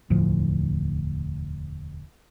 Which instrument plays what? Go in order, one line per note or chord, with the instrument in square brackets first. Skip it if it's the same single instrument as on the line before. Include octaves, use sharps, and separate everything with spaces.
[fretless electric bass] E1 D2 A2 F3